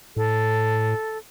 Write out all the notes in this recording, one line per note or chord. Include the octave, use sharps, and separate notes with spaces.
A2 A4